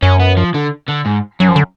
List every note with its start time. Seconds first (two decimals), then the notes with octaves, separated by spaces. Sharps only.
0.02 F#2 C#4
0.20 B3
0.37 F3
0.54 D3
0.89 D3
1.06 G#2
1.40 F#2 F#3
1.49 F3
1.56 D3